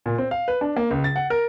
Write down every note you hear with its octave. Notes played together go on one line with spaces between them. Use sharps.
A#2
C4
F5
B4
D4
A#3
C#2
A6
F#5
A#4